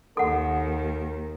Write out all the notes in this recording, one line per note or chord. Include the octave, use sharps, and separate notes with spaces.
D#2 D#3 A4 A#4 F#5